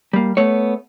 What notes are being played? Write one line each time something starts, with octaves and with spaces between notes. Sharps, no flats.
G3 A#3
A3 B3 C#5